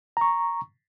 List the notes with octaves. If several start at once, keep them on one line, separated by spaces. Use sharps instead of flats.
A#5 C#6